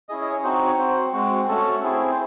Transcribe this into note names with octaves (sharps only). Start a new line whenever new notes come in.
C#4 E4 G#4 D#5
D#5
C#5
C4 D#4 F#4 C5
C#5
C4 F#4 C5
G#3 C4 F#4
A3 C#4 F#4 A4
C4 E4 G#4
C5